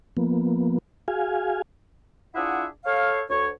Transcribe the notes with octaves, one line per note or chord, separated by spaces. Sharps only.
F3 A#3 B3
F#4 G#4 F5 G#5
D4 E4 F4 G#4 E5 F#5
A4 C#5 F5
D2 C#5